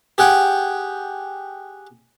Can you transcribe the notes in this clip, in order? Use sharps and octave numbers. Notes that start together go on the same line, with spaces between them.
G4 G#4 F#5 G5